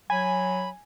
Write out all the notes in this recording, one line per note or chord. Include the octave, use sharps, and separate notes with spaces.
F#3 G#5 B5